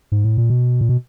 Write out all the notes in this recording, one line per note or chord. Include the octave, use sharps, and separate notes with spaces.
G#2
A2
A#2
B2
A#2
B2